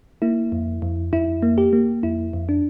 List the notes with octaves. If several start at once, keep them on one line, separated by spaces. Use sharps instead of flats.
A#3 E4
F2
F2
F2 E4
A#3
G4
A#3
F2 E4
F2
D4